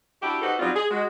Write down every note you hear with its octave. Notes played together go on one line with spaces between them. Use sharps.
D4 E4 F#4 G4
D#4 F#4 G4 A4 B4 C5
F#3 G3 C4 C#4 D#4 F4
G#4
G#3 F#4